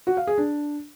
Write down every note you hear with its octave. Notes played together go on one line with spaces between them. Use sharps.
F#4
F5
G#4
D4